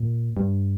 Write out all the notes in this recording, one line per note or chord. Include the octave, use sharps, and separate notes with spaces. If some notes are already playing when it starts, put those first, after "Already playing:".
Already playing: A#2
G2